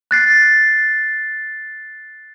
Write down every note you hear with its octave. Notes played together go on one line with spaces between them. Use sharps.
F#6 A6 C7